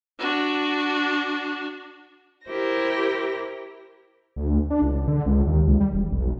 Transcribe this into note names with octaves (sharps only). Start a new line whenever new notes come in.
D4 F#4
E4 G4 A#4 C5 A#6
D2
D4
C#2
D3
C#2
D#2
C#2
G3
E1
B1